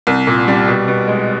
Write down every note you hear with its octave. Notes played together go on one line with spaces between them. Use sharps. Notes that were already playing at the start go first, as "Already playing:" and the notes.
C2
A#2
G3
B2
B2
G#3